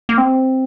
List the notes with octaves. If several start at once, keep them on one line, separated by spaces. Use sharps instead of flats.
A#3
C4